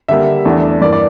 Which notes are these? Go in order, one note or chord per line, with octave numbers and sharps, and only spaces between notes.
D3 G3 A#3 E5
E2 E3 A3 D4
G2 E3 A#3 D5
D5